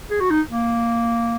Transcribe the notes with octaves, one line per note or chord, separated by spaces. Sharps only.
G#4
F#4
D#4
A#3